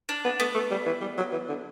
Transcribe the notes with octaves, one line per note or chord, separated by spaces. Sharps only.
D4
B3
A3 B3
A3
G3
E3
G3
F#3
E3
D3